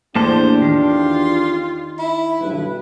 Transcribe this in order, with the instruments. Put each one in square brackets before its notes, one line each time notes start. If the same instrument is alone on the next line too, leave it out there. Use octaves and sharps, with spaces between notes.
[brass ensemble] E2 D4 G4 [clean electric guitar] A2 A#3 A5 [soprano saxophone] C5
[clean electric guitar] D#3 [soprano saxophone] F4
[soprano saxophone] E4
[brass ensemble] B1 G2 B4